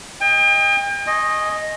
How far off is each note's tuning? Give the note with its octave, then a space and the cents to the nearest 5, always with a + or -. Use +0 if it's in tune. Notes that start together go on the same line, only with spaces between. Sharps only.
D#5 +5 G5 +40
D#5 +0 G#5 +0 C#6 -40